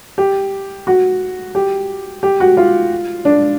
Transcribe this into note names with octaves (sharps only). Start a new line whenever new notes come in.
G4
F#4
G4
G4
F#4
F4
D4